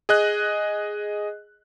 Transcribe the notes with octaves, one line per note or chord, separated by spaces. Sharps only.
G#4 D#5 F#6